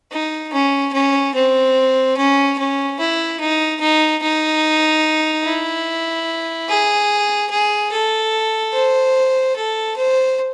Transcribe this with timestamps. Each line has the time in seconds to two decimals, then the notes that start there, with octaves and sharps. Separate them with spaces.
0.11 D#4
0.53 C#4
0.93 C#4
1.34 C4
2.17 C#4
2.58 C#4
2.99 E4
3.40 D#4
3.80 D#4
4.22 D#4
5.45 E4
6.69 G#4
7.50 G#4
7.92 A4
8.73 C5
9.56 A4
9.96 C5